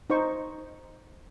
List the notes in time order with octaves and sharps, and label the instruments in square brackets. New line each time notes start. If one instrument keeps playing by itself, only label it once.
[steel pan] D#4 C5 C#6